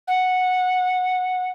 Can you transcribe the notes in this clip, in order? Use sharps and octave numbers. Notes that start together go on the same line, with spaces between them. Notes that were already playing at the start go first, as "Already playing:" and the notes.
F#5